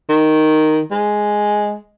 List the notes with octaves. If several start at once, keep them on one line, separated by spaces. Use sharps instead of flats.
D#3
G#3